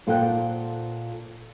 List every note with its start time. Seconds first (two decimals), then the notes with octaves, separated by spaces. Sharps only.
0.07 A#2 F4 A4 C5 F#5 G5